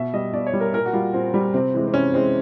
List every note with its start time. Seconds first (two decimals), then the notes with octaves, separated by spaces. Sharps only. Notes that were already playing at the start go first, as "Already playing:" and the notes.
Already playing: B2 E5
0.14 G3 D#5
0.33 B2 D5
0.47 C#5
0.53 G3
0.60 A#4
0.74 A#2 A#4
0.86 F#4
0.93 G3 F4
1.14 A#2 C4
1.34 G3
1.54 C3 C4
1.74 E3 G#3
1.87 C4
1.94 C3 C#4
2.14 E3 G#3 C4